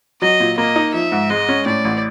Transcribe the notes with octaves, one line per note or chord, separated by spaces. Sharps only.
F#3 D#5
A#2
A#3 D#5
D#4
F3 E5
G#2
G#3 D#5
C#4
A2 D5
A1